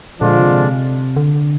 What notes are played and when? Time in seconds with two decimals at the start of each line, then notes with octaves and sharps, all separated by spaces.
0.21 A#2 D3 F3 G#3 D4 F4
0.38 C3
1.16 D3